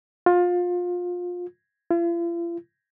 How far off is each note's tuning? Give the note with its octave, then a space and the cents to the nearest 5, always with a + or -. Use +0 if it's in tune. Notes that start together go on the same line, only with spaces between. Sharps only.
F4 +25
F4 -45